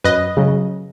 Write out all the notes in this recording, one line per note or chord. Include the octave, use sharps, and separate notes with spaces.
F#2 B4 D#5
C#3 F#3